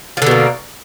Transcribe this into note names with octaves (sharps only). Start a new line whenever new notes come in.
B2 D3 F3 A#3